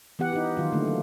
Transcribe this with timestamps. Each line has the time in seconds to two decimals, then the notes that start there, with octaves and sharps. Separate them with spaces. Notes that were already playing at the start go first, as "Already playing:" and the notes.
0.19 E3 B3 G4 F#5
0.33 D#4 G4
0.57 D#3 F#3 F4
0.73 D3 A3 A#3
0.87 F#3